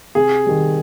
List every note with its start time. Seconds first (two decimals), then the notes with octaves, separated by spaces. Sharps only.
0.15 C3 G#4
0.46 D#3 G3